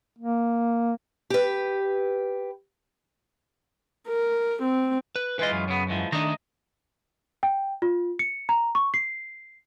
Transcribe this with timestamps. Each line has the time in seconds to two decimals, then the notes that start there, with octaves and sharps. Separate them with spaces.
0.19 A#3
1.30 G4 B4
4.08 A#4
4.62 C4
5.16 B4
5.39 E3 G#3 F4 B4 D#5
5.51 F#2
5.68 C#3 B3
5.89 G#2 E3 F3
6.12 D#3 A3 D4 D#5 A#5
7.43 G5
7.82 F4
8.19 C#7
8.49 A#5
8.75 C#6
8.94 C7